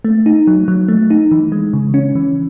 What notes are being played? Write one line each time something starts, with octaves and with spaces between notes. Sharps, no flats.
A3
D#4
F#3
F#3
A3
D#4
E3
G#3
C#3
C#4
E3